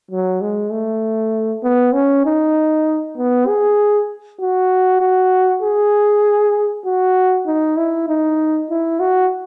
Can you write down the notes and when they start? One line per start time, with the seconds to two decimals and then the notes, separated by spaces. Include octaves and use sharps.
0.11 F#3
0.42 G#3
0.72 A3
1.63 B3
1.94 C#4
2.26 D#4
3.18 B3
3.48 G#4
4.41 F#4
5.01 F#4
5.62 G#4
6.86 F#4
7.47 D#4
7.77 E4
8.09 D#4
8.70 E4
9.00 F#4